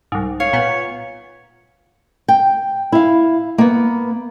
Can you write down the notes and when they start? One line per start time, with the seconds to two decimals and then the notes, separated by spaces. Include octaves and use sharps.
0.12 C2 G#2
0.40 C#5 F5
0.53 A#2 B3
2.28 G5
2.92 E4 F5
3.58 A#3 B3